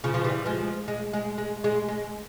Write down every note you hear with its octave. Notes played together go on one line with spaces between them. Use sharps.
C#3 F3
F3
E3 G3
F3 G#3
G#3
G#3
G#3
G#3
G#3